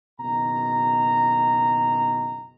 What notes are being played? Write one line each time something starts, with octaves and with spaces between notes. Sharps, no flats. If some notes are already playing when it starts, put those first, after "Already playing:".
F#1 B2 D#3 A#5